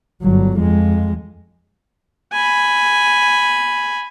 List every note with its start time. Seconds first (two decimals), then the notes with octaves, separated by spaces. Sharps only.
0.22 G1 F#3
0.58 F2 G#3
2.33 G#5 B5